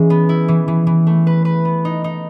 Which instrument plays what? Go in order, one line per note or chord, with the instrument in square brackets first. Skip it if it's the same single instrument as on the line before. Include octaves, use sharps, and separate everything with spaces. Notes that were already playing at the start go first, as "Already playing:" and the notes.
Already playing: [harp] E3 G#3 C#4
B3
E4
E3
E3
E3
A3
B4
B4
B3
D#4
D#4